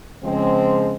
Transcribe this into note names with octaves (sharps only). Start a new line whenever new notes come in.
C#3 F3 G#3 C4